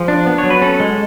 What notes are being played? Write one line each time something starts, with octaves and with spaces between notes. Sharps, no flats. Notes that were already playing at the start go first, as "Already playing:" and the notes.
Already playing: F3 G#4
D4
B3
C#5
F#3
B4
C#4 A4
G#3